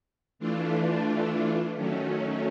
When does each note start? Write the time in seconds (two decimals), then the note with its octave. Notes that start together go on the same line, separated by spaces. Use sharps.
0.39 E3 A3 D4 F4
1.75 D#3 F#3 A3 C#4